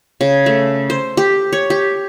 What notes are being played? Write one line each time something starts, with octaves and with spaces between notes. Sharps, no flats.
C#3
A3
C5
G4
C#5
G4